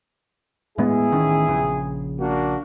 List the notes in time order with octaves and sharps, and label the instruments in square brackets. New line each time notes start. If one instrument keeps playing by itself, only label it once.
[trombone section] E2 E4 G#4 [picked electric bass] A2 G#3 B3
[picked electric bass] A1 D#3 C#4
A#1 C#3
[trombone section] A#3 D4 F#4